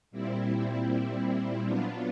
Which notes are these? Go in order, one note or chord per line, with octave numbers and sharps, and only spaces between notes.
A#2 G3 C4 E4
F#3 B3 D4 F4